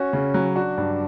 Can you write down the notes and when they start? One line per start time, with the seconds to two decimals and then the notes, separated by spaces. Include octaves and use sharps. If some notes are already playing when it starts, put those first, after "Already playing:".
Already playing: C#4 F#4
0.13 C#3
0.34 F#3
0.55 D4 F#4
0.78 G2